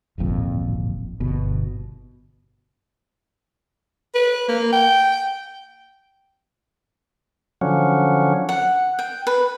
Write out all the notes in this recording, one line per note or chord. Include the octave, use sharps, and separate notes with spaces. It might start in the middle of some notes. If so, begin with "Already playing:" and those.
D1 G#1 F2 A#2
G1 B2
B4
A#3
G5
D3 F3 F#3 C#4
F#5
G5
B4